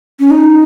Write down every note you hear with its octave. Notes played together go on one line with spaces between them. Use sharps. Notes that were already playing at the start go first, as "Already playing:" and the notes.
C#4
D#4